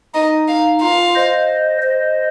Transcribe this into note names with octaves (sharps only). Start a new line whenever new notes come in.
D#4 D#5
F5
F4 F5
C5 D#5
C5 D#5